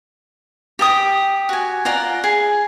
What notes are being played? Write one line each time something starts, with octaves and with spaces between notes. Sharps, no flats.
G4 G5 G#5 D#6
F#4 G#5
F4 D5 F#5 A#5
G#4